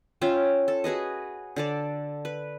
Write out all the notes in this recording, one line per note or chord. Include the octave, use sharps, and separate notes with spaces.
C#4 F4 E5 G5
A4
F#4 G#4 B4 D#5
D3 A4 D5
B4